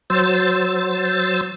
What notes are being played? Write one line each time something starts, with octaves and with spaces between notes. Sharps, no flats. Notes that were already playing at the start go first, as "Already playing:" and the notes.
F#3 C5 E6 A6